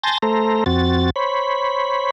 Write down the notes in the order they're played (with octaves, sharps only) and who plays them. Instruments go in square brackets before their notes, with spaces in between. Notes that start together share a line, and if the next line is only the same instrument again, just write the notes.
[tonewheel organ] G#5 A5 C6 G6 A6 A#6
A3 A4 C5 A#5
F2 C4 F#4 A6
C5 C#5 B5